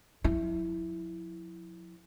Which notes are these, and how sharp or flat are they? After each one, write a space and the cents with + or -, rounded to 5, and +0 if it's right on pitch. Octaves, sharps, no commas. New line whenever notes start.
F3 +45 E4 +0